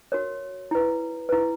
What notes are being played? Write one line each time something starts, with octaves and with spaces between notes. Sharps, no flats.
F#4 A#4 C#5
E4 B4
E4 B4